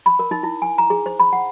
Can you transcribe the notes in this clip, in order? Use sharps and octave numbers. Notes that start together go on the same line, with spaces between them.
B5
A#4
D#4
E4
G#5
A#5
G#4
C5
B5
F#5